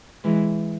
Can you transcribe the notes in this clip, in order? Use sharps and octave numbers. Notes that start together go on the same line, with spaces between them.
E3 G#3